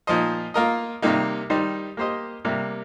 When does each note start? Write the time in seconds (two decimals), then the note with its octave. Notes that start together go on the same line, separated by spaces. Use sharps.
0.07 A#2 F3 D#4 C5 D#5
0.54 A#3 F4 A#4 D#5
1.02 C3 D#3 G3 A#3 D#4
1.50 D#3 G3 D#4 C5
1.97 A#3 G4 C5 D#5
2.45 C3 G3 A#3